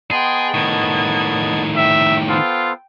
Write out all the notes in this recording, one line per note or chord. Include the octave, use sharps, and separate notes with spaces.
B3 G#4 D#5 G5 A5 C6
A2 D#3 G#6
E5 G5
B3 F4 A4 C5